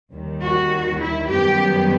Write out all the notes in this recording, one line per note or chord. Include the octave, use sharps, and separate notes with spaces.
D#2 D#3 G3
F#4
E4
F#2 D#3 G3 B3 G4